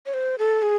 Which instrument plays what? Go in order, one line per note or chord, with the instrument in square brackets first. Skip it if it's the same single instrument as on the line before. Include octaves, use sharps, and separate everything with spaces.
[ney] C#5
C5
A4
G#4